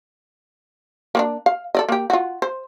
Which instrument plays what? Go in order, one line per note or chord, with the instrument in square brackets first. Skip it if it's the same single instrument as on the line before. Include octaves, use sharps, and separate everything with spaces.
[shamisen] A#3 B3 D4
F5
A4 D5 D#5
A#3 G4
F4 F#4
C5